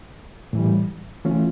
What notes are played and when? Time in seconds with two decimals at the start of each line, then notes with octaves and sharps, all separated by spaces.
0.53 A2 E3 G3
1.25 E3 A3 C#4 F4